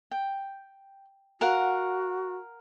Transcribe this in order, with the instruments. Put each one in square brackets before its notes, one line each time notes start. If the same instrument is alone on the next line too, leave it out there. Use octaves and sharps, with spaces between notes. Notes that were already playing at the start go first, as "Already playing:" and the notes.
[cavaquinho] G5
[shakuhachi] F#4 [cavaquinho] A#4 F5 F#5